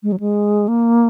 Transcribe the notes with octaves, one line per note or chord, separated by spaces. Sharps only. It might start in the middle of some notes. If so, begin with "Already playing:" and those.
G#3
F#3
G#3
A#3